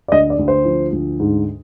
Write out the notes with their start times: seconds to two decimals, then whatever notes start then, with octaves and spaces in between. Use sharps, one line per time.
0.08 D5
0.12 D2 D#5
0.30 D5
0.39 D2
0.48 C5
0.65 F3
0.92 D2
1.19 G#2